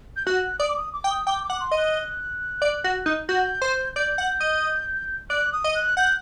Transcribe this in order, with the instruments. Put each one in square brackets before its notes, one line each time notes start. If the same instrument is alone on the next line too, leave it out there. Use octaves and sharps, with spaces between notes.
[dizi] G6
[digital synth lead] F#4 [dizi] F#6
[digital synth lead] D5 [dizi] D#6
[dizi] D6
D#6
D6
[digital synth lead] G5
[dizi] D#6
[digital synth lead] G5 [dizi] D6
[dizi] D6
[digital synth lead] F#5
[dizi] D6
C6
[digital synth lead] D#5
[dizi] F#6
[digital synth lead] D5
F#4
D#4
[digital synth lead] F#4 [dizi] G6
[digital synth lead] C5
[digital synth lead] D5 [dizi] G6
[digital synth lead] F#5
D#5
[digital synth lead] D5 [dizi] F#6
[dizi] D#6
[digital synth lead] D#5
[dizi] F#6
[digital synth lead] F#5 [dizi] G6